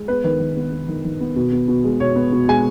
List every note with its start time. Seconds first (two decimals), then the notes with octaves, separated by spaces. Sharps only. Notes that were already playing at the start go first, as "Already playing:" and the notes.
Already playing: G#3
0.08 B3 B4
0.24 D#3 B4
0.40 D#3
0.56 B3
0.72 B3
0.88 D#3
1.04 D#3
1.20 B3
1.36 B2
1.52 B3
1.68 B2
1.84 G#3
2.00 B2 C#5
2.16 B3
2.32 B2
2.48 G#3 G#5